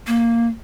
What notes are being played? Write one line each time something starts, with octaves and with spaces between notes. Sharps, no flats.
A#3